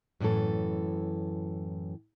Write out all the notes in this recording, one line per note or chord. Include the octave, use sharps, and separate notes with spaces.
F#2 A2 D#3 E3 A4